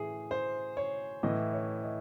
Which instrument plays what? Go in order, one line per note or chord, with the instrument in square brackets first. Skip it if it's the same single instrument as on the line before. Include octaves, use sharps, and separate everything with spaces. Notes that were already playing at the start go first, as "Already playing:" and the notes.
Already playing: [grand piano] A2 E3 G#4
C5
C#5
A2 E3 D#5
C#5
D#5